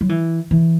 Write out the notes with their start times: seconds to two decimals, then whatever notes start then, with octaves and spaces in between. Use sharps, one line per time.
0.01 F#3
0.09 E3
0.51 E3